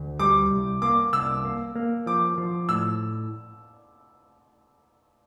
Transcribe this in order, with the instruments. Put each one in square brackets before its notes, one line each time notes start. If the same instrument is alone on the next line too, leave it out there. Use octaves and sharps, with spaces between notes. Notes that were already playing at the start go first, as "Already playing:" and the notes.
Already playing: [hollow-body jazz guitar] D2
[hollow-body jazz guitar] G3 [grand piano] D6
[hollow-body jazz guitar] C2
[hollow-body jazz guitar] A#3 [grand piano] D6
[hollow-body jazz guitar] C2 [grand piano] E6
[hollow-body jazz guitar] A#3
A#3
[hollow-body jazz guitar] F3 [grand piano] D6
[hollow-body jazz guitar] F3
[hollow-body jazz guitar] A2 [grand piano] E6